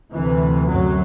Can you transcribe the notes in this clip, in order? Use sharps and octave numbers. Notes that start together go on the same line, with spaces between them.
D2 C3 E3
F#2 F#3